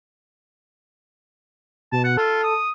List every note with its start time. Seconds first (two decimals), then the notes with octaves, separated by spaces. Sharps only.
1.92 B2 A5
2.04 F#5
2.17 F4 A4
2.43 D#6